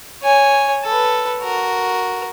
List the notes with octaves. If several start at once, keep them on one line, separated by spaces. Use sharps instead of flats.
C#5 G#5
A4 B4
F#4 A#4